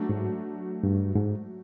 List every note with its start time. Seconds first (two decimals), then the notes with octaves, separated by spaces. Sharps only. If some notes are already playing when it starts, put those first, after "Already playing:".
Already playing: F#3 A3 D4
0.09 G#2
0.83 G2
1.15 G#2